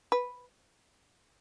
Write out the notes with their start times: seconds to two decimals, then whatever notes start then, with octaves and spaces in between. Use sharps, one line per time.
0.12 B4